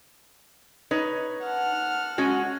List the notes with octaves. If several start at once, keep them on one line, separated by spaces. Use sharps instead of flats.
D#4 B4 C#5
F#5 A5 F6
G#3 C#4 F#4